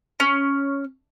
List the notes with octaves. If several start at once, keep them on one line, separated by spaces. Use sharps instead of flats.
C#4